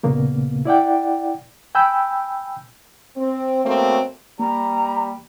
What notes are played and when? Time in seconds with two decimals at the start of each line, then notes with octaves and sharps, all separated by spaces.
0.03 D#2 A#2 C#3 A#3 B3
0.65 E4 D5 F#5 G5
1.75 G5 G#5 B5 E6 G6
3.17 C4
3.65 B2 F#3 A3 A#3 C4
4.39 G3 A#3 A#5